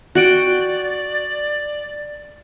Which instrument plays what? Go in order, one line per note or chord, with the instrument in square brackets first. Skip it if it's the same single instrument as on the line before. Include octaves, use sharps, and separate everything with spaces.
[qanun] F#4 F#5 G5 [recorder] D5